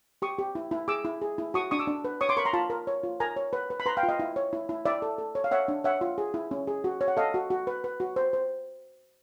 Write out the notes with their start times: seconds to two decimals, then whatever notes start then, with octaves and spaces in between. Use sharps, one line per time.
0.22 G4 C#6 D#6
0.39 G4
0.55 E4
0.71 E4
0.88 G#4 D6 E6
1.05 E4
1.22 G#4
1.38 E4
1.54 F#4 C#6 D#6
1.71 D4 C#6 D#6
1.79 D6 E6
1.87 D4
2.05 B4
2.21 C#5 C#6 D#6
2.29 C6 D6
2.37 A#4 B5 C#6
2.45 A#5 C6
2.53 F4 A5 B5
2.70 A#4
2.87 C#5
3.03 F4
3.20 A#4 G#5 A#5
3.36 C#5
3.53 B4
3.70 B4
3.80 B5
3.86 B4 A#5 C6
3.97 F5 G5
4.03 F4
4.09 D#5 F5
4.19 E4
4.36 C#5
4.53 E4
4.69 E4
4.86 E4 D5 E5
5.02 A4
5.18 A4
5.35 C#5
5.44 F5
5.51 C#5 E5 F#5
5.68 D4
5.84 C#5 E5 F#5
6.01 F4
6.18 G#4
6.34 E4
6.51 C#4
6.67 G#4
6.84 F#4
7.01 C#5
7.08 F#5
7.17 A4 D#5 F5
7.34 F#4
7.50 F#4
7.67 B4
7.84 B4
8.00 F#4
8.16 C5
8.33 C5